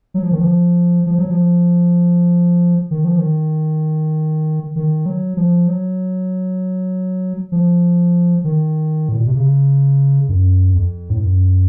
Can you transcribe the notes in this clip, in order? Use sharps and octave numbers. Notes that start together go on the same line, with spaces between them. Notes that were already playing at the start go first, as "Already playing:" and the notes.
F#3
F3
D#3
F3
F3
F#3
F3
D#3
F3
D#3
D#3
F#3
F3
F#3
F3
D#3
A2
A#2
C3
C#3
F#2
F2
A2
F#2